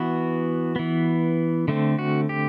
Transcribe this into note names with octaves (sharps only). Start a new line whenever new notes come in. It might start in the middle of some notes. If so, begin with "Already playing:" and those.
Already playing: E3 B3 F#4
E3 B3
D3 A3 C4
F#4
G4